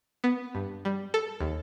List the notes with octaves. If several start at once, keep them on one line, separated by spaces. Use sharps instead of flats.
B3
G2
G3
A4
D#2